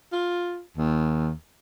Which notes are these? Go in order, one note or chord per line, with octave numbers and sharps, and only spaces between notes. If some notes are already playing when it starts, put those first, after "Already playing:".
F4
D#2